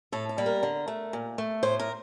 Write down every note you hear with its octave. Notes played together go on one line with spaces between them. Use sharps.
A2 A4
A4
G3 A#3
A#4
D3
A3
A#2
A3
A2 C5
A#4